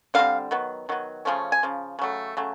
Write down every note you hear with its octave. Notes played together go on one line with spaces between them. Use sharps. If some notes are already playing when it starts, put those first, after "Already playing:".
D3 G3 C4 F5
D#3 F#3 B3
D#3 F#3 B3
C#3 F3 A3 C#4
G#5
C#3 F3
C#3 F#3 A3
C#3 F#3 A3